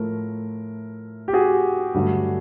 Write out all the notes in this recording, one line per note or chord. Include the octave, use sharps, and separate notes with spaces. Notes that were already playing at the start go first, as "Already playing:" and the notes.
Already playing: A2 F3 A3 A#4
G4
F#4 G#4
G2 D3 F#3 A3